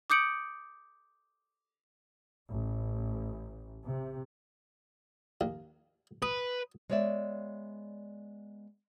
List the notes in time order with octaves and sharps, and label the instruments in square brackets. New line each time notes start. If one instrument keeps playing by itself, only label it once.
[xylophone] D6 D#6 G6 C#7 D7 F#7
[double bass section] A1
C3
[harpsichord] D#2
[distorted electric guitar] B4 [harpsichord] D#6
[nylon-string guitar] G#3 B3 C#5 D5 E5